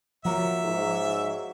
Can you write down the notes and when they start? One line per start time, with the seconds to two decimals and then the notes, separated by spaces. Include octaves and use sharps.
0.25 F3 F#3 A#3 E5 F#5
0.64 G#2